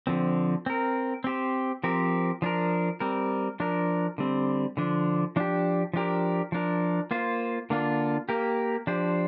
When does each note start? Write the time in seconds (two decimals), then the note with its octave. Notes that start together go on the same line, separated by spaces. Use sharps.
0.07 D3 F3 C4
0.66 C4 A#4
1.24 C4 G4 C5
1.84 F3 C4 G4 A#4
2.42 F3 D4 A#4
3.00 G3 C4 A#4
3.60 F3 D4 A#4
4.18 D3 G3 C4
4.77 D3 F3 D4
5.36 F3 D4 G4
5.94 F3 D4 G4 A#4
6.52 F3 D4 A#4
7.11 A#3 F4 C5
7.70 D3 A#3 D4 F4
8.29 A#3 G4 A#4
8.87 F3 D4 G4 C5